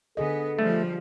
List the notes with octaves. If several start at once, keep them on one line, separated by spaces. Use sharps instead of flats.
D3 B3 G#4 A4 D#5
F3 G3 A3